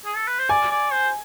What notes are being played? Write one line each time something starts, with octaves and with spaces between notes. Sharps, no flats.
G#4
A4
B4
C5
D5 G#5
D5
C5